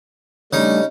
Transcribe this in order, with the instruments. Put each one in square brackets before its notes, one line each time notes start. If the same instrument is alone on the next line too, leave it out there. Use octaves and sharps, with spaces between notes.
[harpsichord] C#3 D#4 [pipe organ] G3 A3 D4